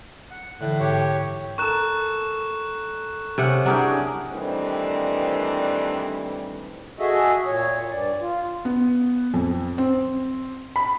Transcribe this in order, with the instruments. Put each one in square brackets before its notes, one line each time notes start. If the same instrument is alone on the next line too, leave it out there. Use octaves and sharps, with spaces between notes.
[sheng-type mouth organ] F#5
[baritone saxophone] A2 [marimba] D3 E3 [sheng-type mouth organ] F#6
[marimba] G#2 [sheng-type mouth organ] G4 C#5
[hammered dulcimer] A4 A#4 [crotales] C#6 F#6 E7
[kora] C3 C#4 F#5
[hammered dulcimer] F#3 E4 G#4 [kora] D4 G4 A#4
[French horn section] D#3 E3 G3 A3 C4 D4
[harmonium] F#4 G#4 A4 D#5 E5
A#2 C#5
G2 D5
F4
[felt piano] B3
F2
C4
B5